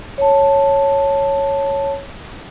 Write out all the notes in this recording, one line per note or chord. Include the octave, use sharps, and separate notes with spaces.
C#5 A5